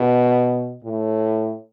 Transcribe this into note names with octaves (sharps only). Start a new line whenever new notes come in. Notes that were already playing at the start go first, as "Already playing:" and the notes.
Already playing: B2
A2